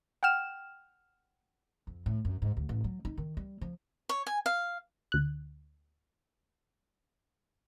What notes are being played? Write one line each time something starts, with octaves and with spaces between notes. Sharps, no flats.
F#5 G5 F6 E7
F2
A2
F#2
G#2
D2
A1
F#3
D#4
D#3
G3
F3
C#5
G#5
F5
D2 F#6